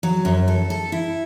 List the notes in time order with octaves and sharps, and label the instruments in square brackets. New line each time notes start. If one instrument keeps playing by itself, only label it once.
[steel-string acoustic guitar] F#3
F#2
A4
A4
E4